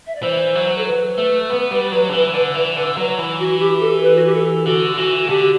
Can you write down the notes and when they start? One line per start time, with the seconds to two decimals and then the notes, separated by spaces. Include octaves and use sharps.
0.07 E5
0.15 D5
0.23 E3 C5
0.55 F#3
0.78 A4
0.86 B4
1.18 A3
1.50 B3
1.71 G3
1.92 F#3
2.09 D3
2.13 E3
2.34 D3
2.55 E3
2.76 D3
2.97 F#3
3.18 E3
3.40 F#4
3.60 G4
3.81 A4
4.03 B4
4.16 F#4
4.25 G4
4.34 A4
4.66 D3 F#4
4.97 E3 F#4
5.29 D3 G4